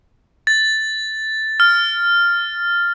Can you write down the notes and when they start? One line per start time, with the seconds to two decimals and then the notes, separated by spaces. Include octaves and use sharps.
0.47 A6
1.60 F6